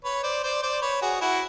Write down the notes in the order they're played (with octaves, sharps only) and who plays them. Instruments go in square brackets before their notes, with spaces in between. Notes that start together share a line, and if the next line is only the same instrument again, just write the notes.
[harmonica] B4 C#5
C5 D5
C5 D5
C5 D5
B4 C#5
F#4 G#4
E4 F#4